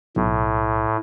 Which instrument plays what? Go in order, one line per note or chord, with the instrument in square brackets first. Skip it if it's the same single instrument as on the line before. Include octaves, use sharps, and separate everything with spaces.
[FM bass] B1 [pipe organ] A2